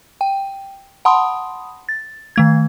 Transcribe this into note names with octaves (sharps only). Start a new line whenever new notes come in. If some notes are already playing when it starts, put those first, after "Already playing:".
G5
F#5 A5 B5 C6 D#6
A6
D#3 A3 G#6